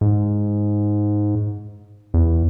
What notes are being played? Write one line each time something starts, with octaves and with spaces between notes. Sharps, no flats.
G#2
E2